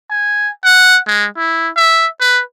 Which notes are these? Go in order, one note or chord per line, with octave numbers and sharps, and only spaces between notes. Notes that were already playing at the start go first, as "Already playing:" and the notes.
G#5
F#5
G#3
E4
E5
B4